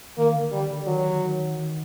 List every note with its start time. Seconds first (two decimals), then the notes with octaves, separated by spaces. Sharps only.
0.17 D#3 A#3
0.35 D3
0.52 D3 G3
0.71 D3
0.87 D#3 F#3
1.23 D#3
1.58 D#3